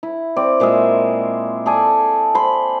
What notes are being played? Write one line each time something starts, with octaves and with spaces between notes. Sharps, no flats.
E4
C4 D5
A#2 G#3 G#4 E5
G#4 A4 D5 G#5
C5 B5